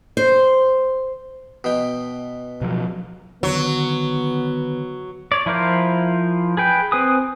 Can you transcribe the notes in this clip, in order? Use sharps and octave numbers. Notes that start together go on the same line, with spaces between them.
C5
B2 G5
B2 F3 F#3
D3 D#3 F#3 B3
C#5 D5
F3 E4 F4 A#4 C5
G#4 B4 G5
C4 B4 G#5 D#6